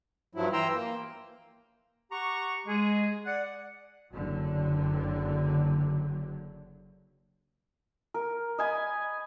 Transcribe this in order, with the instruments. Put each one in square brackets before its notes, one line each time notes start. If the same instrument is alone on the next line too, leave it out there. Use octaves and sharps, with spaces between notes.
[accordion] G2 F3 F#3 E4
E3 G5 A#5 C6 E6
A#3
[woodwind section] G4 F#5 A#5 C#6
G#3 G#4
D5 F#5
[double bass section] F#1 D3 F#3
[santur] A#4
D#5 G#5 B5